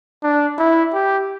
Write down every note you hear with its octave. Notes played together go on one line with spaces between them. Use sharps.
D4
E4
G4